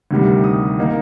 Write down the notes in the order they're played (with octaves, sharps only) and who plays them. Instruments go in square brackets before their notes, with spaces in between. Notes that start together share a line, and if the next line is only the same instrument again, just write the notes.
[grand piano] D2 C3 D#3 G3
D#6
D#3 A#3 D#4